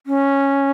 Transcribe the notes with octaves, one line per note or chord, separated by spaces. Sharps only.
C#4